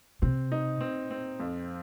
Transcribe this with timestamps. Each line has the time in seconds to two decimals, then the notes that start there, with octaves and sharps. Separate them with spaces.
0.22 C3 C4
0.52 D#4
0.81 C4
1.11 C4
1.40 F2